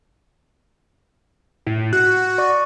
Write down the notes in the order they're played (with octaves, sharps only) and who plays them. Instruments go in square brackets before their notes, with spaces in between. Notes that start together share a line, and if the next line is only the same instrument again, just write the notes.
[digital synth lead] A2
[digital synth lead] F#4 [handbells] F#6
[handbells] D5 C#6